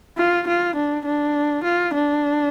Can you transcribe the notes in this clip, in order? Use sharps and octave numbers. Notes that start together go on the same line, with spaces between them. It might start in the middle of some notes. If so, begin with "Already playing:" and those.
F4
F4
D4
D4
F4
D4